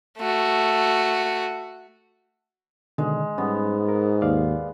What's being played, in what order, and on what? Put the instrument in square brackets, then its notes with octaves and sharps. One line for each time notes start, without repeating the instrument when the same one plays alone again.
[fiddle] A3 F#4
[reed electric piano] B2 D3 D#3 [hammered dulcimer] G#3
[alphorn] G#2 [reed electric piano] G3 C#4 [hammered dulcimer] B3
[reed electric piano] A#4
[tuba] D#2 [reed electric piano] D5 F5